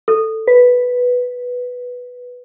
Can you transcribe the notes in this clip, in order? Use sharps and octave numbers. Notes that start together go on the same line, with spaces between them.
A4
B4